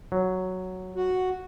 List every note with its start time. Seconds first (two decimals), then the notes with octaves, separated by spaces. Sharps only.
0.12 F#3
0.95 F#4